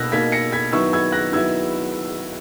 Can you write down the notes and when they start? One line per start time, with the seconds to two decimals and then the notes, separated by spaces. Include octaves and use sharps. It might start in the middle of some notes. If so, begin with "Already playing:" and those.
Already playing: B2 A#3 D#4 E6 F#6 A#6
0.12 B2 A#3 D#4 G#6 B6
0.32 A#6 C#7
0.52 G#6 B6
0.72 D#3 F#3 B3 E4 C#6 E6
0.93 E6 G#6
1.12 F#6 A#6
1.32 D#3 F#3 B3 E4 E6 G#6